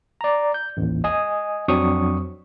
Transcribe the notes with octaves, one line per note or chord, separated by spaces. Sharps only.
D5 A#5
G6
A1 D#2
D#5 G#5 D#6
F2 F#3 C4 D4 C#6 D#6